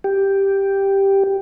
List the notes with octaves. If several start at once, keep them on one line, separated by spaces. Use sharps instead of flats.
G4